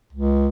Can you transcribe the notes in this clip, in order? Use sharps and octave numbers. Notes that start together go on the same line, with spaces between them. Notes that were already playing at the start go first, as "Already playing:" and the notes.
C#2